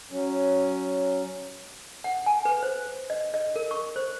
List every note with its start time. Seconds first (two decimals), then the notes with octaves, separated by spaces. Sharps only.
0.11 F#3 C#4
2.04 F#5
2.26 G#5
2.45 B4
2.63 C5
3.10 D#5
3.34 D#5
3.56 A#4
3.71 C#6
3.96 C5